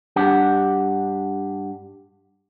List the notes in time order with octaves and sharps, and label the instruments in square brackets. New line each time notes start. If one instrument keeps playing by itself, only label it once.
[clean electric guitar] G2 D4 G4 F#5